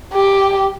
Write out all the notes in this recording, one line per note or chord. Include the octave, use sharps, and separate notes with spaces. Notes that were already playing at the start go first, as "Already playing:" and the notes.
G4